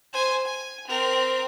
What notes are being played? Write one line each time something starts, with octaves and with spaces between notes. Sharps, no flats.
C5 G#5
G#5
C4 A#4